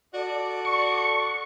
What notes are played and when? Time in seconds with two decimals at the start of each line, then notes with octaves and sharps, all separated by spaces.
0.15 F#4 A4 D5
0.65 C#6